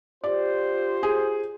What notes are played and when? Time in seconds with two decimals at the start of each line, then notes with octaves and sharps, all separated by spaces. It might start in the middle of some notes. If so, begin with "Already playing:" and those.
0.24 F4 G4 C5 D5
1.03 G#4